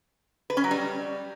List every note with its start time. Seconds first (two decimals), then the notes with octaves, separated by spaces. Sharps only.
0.50 B4
0.57 C#4
0.64 F#3
0.71 G3